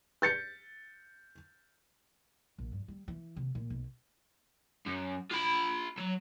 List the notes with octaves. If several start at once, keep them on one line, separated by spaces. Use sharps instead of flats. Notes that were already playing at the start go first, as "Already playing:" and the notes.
G6 A6 C#7
A#1
G2
G3
E3
C3
A#2
B1
F#2
F4 B5
F#3